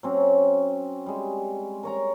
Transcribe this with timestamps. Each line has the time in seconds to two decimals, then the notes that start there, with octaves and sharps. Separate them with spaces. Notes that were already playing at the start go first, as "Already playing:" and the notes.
0.03 F#3 C4 C#4
1.06 G3 G#3
1.83 A#4 C#5 A#5